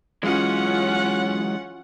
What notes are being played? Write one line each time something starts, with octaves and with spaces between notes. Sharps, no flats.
E3 F#3 G#3 C#4 F4 F#5